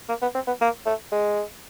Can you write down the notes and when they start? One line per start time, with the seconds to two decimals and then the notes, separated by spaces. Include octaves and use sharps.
0.09 A#3
0.22 B3
0.35 C4
0.47 B3
0.61 A#3
0.86 A3
1.12 G#3